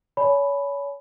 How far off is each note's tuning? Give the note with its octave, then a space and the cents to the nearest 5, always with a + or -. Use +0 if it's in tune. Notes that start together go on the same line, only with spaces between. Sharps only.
C#5 +30 G#5 +35 B5 +0